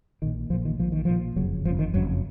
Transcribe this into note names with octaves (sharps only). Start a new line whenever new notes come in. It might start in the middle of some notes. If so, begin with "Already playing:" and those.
A#1 A#2 D#3
A#1 A#2 F3
D#3
A#1 A#2 F3
D#3
A#1 A#2 F3
F#1 F2 C#3 F#3
F#1 F2 C#3 F3
D#3
F#1 F2 C#3 F#3